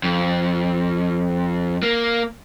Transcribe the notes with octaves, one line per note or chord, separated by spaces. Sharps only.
F2
A#3